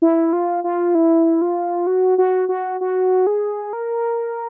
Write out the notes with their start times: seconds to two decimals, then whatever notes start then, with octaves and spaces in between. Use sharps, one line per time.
0.02 E4
0.33 F4
0.64 F4
0.95 E4
1.42 F4
1.87 F#4
2.18 F#4
2.49 F#4
2.81 F#4
3.27 G#4
3.73 A#4